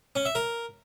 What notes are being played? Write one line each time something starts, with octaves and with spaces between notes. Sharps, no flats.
C#4
E5
A#4